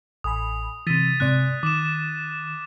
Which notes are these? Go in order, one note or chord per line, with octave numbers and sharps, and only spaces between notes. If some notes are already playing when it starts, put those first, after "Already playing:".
A1 G#5 B5 D#6
C3 E3 A6 B6 D#7
G#2 C3 D5 F#6
D#3 D6 E7